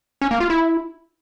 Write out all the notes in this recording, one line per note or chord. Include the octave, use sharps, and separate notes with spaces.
C#4
A#3
F4
E4